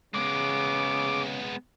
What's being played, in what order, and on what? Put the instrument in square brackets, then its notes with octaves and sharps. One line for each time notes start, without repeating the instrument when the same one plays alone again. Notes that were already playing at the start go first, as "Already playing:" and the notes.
[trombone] C#3 [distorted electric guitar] G#3 B3 [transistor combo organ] D6